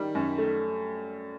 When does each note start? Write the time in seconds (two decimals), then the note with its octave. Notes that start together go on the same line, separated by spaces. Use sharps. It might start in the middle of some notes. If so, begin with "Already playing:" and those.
Already playing: D#3 G3
0.15 F#2
0.38 A3